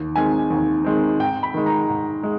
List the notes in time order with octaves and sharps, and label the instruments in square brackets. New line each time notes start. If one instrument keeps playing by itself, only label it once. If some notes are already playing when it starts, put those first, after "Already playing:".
Already playing: [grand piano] D#2
D#3 G#3 C4 G#5
D#2
D#3 G#3 C4
G#2 G5
B5
D#3 G#3
A#5
G#2
G#3